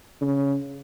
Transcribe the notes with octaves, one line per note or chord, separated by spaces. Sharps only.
C#3